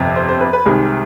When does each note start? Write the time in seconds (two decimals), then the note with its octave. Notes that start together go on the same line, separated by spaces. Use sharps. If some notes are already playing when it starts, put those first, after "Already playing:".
Already playing: G1 F2 C3
0.16 C5
0.29 C5
0.41 B4
0.53 B4
0.66 C2 C3 D#3 G#3 G#4